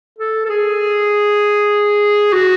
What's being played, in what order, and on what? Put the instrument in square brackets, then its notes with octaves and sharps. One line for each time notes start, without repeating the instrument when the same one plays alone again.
[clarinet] A4
A4
G#4
F#4